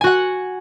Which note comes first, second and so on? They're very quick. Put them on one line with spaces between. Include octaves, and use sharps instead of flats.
G#5 F#4 F#5